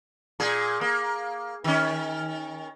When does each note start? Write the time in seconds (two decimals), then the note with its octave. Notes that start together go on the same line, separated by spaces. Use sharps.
0.40 A#2 G#4
0.81 A#3
1.64 D#3 C#4